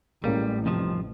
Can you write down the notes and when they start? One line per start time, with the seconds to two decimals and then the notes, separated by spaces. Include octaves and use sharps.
0.24 A1 G3 G#3 A#3 C#4
0.66 F2 C3 D#3 F3 G3